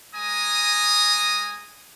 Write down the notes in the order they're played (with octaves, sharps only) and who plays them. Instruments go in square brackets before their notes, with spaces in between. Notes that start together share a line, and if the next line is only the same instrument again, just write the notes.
[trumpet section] G#3 G#5 A#5 D#6